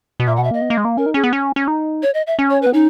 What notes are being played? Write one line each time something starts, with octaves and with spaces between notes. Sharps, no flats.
B2
A#2 E5
B2 F#5
E5
A#3 D#5
B3
A#3
G#3
A#3
C#4 A#4
D#4
C#4 G#4
B3
C#4
C#4
D#4
C#5
D#5
E5
C#4
C#5
B4
B3
C#4 D#4